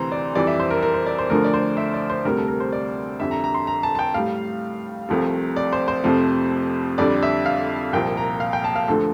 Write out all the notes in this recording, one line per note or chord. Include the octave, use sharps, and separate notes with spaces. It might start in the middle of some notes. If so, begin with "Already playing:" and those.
Already playing: D2 C3 E3 C5 A#5 C6
D5
F2 E3 G3 D5
E5
C5
A#4
A#4
C5
D5
C5
D2 D3 F3 A3 A#4
D5
C5
E5
D5
C5
D2 C3 G3 A#4
A4
A#4
C5
D5
F2 D3 G3 E5
A#5
A#5
C6
A#5
A5
A5
G5
A2 G3 F5
C2 C3 F3 A3
D5
C5
C5
F2 C3 F3 A3
F2 D3 G3 D5
E5
F5
C2 A#2 F3 G5
A#5
F5
G5
A5
F5
D2 D3 F3 A3 A4